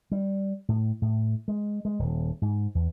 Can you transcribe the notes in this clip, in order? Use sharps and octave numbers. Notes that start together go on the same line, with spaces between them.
G3
A2
A2
G#3
G#3
D#1
G#2
E2